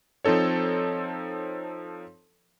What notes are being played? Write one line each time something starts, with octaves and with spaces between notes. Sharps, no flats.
F3 C4 D#4 A4 C#5